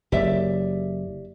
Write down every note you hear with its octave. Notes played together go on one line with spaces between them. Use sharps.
F#1 G4 D5 E5